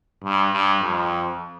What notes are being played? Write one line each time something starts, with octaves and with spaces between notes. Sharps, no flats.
G2
G2
F2